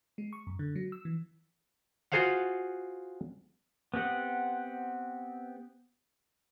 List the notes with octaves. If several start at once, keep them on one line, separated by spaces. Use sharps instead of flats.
G#3
C#6
F#2
D3
F#3
E6
E3
F4 F#4 G#4 C5 F5 F#5
B3 C4 G4 F#5